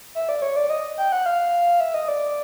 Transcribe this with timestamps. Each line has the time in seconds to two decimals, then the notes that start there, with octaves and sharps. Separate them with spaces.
0.15 E5
0.29 D5
0.42 C#5
0.56 D5
0.70 D#5
0.98 G5
1.12 F#5
1.26 F5
1.80 E5
1.94 D#5
2.08 D5